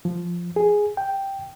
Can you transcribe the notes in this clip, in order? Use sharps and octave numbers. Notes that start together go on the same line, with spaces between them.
F3
G#4
G5